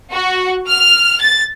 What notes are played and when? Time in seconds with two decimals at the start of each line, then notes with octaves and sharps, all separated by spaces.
0.12 F#4
0.68 F6
1.21 A6